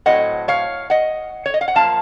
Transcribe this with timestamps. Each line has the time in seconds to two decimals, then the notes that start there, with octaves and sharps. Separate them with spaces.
0.06 A2 F#3 C4 D#5 F#5
0.48 C#5 F5
0.90 D#5 F#5
1.46 C#5
1.54 D#5
1.61 F5
1.68 F#5
1.75 F#2 F3 A#3 F5 A5